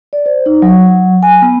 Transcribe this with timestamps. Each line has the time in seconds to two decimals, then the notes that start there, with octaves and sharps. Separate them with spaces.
0.13 D5
0.26 C5
0.46 D#4
0.62 F#3
1.23 G#5
1.42 B3